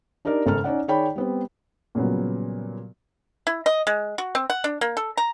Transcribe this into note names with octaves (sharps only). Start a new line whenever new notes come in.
D4 D#4 G4 A#4 D5
G#1 C#3 G#3 A4 A#5 F6
C#4 D#4 D5 F#5
D#3 G#4 C#5 D5 G5 B5
G3 B3 C4
A#2 C#3 F#3 G3 B3
E4
D#5
G#3
F#4
C4
F#5
D4
A#3
A4
A#5